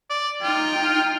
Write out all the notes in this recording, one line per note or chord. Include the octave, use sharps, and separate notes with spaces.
D5
D#4 F4 G5